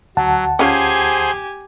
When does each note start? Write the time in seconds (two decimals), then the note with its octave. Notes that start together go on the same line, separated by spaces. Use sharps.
0.17 D2 F#3 F#5 A5
0.59 C#4 F4 G4 G#4 C5 G#5 G#6